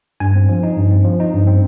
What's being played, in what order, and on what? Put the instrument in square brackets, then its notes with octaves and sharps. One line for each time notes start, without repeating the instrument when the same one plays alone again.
[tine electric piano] G2 G#5
C4
F3
D#4
G2
C4
F3
D#4
G2
C4